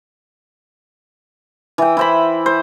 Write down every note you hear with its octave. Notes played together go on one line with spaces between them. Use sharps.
E3 G5
E4 C5 B5
C5